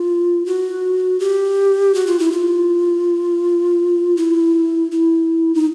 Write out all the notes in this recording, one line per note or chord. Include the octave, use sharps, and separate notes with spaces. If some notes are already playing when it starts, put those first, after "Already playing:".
Already playing: F4
F#4
G4
F#4
F4
E4
F4
E4
E4
D#4